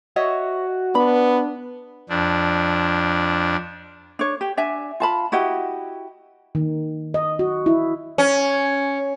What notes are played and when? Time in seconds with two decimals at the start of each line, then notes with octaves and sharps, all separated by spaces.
0.16 F#4 C#5 D#5 E5
0.95 B3 D4 B5
2.09 F2 D4
4.19 D4 C#5
4.41 G4
4.57 D4 E5 G#5
5.00 F4 A5 B5
5.32 E4 F#4 G4 D#5
6.55 D#3
7.14 D#5
7.39 F#4
7.66 E4
8.18 C#4